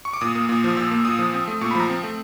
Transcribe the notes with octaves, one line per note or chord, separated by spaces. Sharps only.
C#6
D6
A#2 D#6
A#3
A#2
F3
A#2 E6
A#3
A#2 D#6
F3
C4
A3
A#2 C#6
B5
F3 A#5
C4
A3